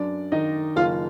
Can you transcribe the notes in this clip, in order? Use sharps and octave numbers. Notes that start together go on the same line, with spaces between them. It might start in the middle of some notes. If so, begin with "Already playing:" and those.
Already playing: F#2 D4 D5
D#3 D#4 D#5
F#1 F4 F5